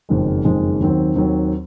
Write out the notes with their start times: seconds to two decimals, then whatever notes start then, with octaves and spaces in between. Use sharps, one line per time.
0.09 F#1 F2 D#3 G#3
0.45 F#1 F2 D#3 G#3
0.80 D#2 D#3 F#3 C4
1.15 D#2 D#3 F#3 C4